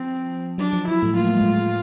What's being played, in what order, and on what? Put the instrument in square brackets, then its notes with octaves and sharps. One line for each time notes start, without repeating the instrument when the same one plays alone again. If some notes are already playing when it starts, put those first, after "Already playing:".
Already playing: [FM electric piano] F3 [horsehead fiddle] C4
[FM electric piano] F#3 [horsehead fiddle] D4
[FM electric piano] F3
[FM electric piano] F#3 [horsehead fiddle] E4
[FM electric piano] A2 A3
[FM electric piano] A#3 [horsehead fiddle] F4
[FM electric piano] A3
G#3
A2 A3